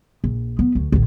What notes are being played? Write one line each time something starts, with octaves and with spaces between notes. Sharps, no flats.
A#1
B3
D2
A1 D3